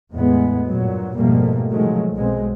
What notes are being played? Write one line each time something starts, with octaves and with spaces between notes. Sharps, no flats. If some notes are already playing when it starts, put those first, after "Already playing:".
E2 A2 G#3 B3
G2 A#2 F#3
F2 G#2 B2 G3 A3 A#3
C3 D#3 F3 F#3 G#3 A3
B1 B2 G#3 C4